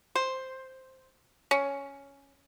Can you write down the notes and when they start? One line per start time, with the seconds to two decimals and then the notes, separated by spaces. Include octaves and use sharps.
0.15 C5
1.51 C#4